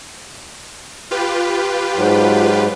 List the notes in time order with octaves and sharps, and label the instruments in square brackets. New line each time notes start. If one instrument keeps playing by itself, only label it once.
[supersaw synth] F4 G4 B4
[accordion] G#2 F#3